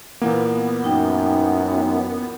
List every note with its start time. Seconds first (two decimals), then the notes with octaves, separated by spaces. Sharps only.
0.22 A#2 E3 A#3 B3
0.84 F#2 D#4 G5